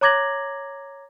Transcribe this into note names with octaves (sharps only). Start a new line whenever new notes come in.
C#5 A#5 D6 G#6 A#6 F#7